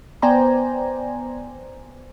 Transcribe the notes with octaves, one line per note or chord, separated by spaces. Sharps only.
B3 C5 D5 G5 G#5 A#5